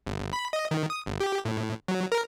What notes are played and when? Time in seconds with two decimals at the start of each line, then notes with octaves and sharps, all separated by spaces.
0.07 G1
0.33 B5
0.53 D#5
0.71 D#3
0.90 D#6
1.06 G1
1.20 G4
1.45 A2
1.88 F#3
2.12 A#4